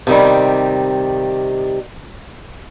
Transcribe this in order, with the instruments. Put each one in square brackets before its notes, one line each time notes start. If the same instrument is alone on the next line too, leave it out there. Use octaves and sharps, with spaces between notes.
[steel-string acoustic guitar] C3 D#3 G3